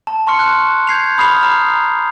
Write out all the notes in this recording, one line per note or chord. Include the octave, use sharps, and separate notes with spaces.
A5
A5 C6 C#6 F6 C#7
F#6
G6 G#6 C7 F7
B5 D#6 F6 C7 F7
A#5 F6